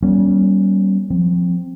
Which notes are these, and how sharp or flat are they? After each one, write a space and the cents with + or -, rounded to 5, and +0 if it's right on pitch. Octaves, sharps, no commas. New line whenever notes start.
G3 -25 A#3 +45 C#4 +0
F3 +15 C4 +0